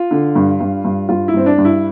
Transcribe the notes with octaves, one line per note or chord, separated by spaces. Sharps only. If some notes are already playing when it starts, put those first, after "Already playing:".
Already playing: F4
D3
G2
G2
G2
G2 F4
E4
G2 C4
D4
G2
E4